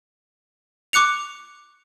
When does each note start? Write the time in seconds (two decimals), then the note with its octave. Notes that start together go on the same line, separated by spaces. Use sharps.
0.93 C#6 D6 F#6 C#7 F7